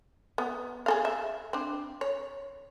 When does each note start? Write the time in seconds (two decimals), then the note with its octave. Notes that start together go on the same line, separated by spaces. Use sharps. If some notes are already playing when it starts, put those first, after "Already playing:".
0.38 B3
0.86 G#4 A4 F5
1.05 E5
1.53 C4 D4
2.01 C#5